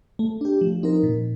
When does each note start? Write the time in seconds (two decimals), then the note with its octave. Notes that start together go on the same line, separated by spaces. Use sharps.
0.19 A3
0.41 D4 G4
0.61 F3
0.83 C4 D#4 A#4
1.03 A#2